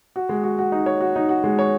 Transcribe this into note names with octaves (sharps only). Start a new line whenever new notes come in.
F#4
G#3
F#4
F#4
D#4
C#5
F#4
D#4
F#4
G#3
C#5